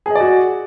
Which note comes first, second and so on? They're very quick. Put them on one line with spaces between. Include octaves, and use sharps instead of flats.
G#4 D#5 D5 F#4